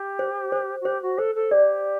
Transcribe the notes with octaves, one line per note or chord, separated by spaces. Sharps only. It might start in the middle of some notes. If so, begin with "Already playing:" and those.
Already playing: G4
C5
C5
F#4
G4 C5
F#4
A4 C5
A4
G4 D5